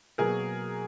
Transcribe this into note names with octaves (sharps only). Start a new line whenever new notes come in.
B2 F#3 A#3 G#4 A#4